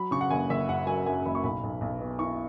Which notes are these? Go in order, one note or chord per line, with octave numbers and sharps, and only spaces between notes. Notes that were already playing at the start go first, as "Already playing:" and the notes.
Already playing: F#3 B5
C#3 C#6
F#5
F#1 G#5
F#1 E5
F#2 F#5
F#3 G#5
F#2 G#5
F#1 B5
C#6
B1 B5
B1
B1
B2
E4 C#6